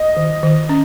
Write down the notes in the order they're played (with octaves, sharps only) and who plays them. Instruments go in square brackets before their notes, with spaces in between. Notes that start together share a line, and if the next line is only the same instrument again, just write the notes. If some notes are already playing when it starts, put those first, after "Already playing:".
Already playing: [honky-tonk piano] D#5
[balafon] D#3
D#3
C#4